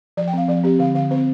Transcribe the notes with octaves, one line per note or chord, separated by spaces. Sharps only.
F3 D5
G5
C4 F5
F3 D5
C4 G4
D3 F5
D3 F5
C4 C5